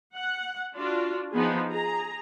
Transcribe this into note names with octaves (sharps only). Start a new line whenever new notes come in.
F#5
D4 F4 F#4
F3 B3 D#4 G#4
G#4 A#5